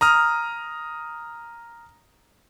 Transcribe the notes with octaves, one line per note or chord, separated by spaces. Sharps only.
A#5 D#6 F6